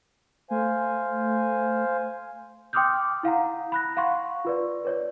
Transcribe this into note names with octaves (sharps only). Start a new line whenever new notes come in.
A3 C5 F5 G#5
G5 C6 D6 D#6 F6 G6
E4 F5 F#5 A#5
B5 F#6 A#6
F5 F#5 C6 C#6
F4 B4 D5
B4 C#5 D5